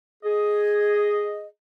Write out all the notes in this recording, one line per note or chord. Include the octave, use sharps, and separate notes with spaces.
G#4 D#5